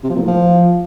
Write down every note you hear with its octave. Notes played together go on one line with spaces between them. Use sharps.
C3
F3
A#2
A2
F3